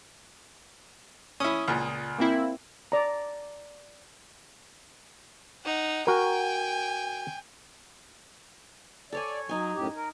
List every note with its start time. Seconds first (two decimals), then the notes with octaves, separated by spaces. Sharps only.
1.40 C#4 E4 D#6
1.68 C#2 A#2
2.18 A#3 C4 E4
2.92 D5 A#5
5.64 D#4 F#5
6.07 F#4 A#4 G5 G#5
9.12 A4 C#5 D5 G#5
9.49 F#3 D#4 G#5
9.74 F#2 A2 G4
9.96 A#4